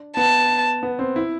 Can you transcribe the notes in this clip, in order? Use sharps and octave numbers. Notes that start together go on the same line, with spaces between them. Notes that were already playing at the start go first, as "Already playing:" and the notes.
Already playing: D4
B3 A5
B3
C4
E4